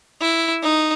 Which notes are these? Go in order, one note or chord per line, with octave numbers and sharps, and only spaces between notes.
E4
D#4